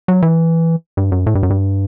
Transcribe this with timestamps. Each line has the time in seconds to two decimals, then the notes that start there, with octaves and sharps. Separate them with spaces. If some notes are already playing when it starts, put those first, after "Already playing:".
0.08 F#3
0.22 E3
0.97 G2
1.12 F#2
1.27 A2
1.35 G2
1.43 F#2
1.50 G2